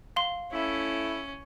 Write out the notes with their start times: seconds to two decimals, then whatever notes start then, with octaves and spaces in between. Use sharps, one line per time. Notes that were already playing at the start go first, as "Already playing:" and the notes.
0.16 F5 C6
0.52 A3 C#4 E4